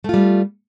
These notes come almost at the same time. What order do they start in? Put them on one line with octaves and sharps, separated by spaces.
A3 F4 G3